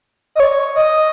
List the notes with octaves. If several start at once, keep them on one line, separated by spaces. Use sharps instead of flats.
D#5
C#5
D#5